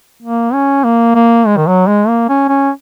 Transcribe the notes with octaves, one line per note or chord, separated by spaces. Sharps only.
A#3
C#4
A#3
A#3
G#3
D#3
F#3
G#3
A#3
C#4
C#4